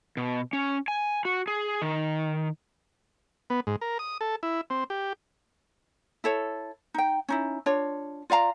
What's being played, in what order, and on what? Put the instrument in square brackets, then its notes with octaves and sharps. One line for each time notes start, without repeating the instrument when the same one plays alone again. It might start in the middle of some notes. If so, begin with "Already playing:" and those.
[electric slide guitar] B2
C#4
G#5
F#4
G#4
D#3
[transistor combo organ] B3
G#2
A#4
D#6
A4
E4
C4
G4
[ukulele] E4 A4 C#5
D#4 G5
C#4 D#4 E4
D4 F4 C#5
F4 D5 F5 A#5